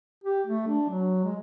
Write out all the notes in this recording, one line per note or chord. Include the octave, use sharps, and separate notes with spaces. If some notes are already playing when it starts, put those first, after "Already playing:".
G4
A3
D4
F#3
G#3